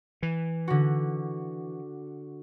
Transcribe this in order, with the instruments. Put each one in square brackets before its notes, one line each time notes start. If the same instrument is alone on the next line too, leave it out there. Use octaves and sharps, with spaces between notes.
[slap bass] E3
[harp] D3 F#4